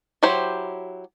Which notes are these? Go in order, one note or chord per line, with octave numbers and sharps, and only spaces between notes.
F#3 E4 G4 C5